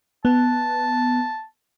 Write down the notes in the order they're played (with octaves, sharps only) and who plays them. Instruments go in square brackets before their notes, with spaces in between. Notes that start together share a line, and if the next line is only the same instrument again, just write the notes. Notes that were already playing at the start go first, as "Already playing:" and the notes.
[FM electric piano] B3 [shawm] A5